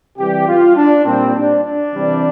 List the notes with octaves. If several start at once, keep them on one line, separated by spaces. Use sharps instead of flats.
C3 E3 G3 G4
F4
D4
A#2 G3 C4
D4
D4
C3 E3 G3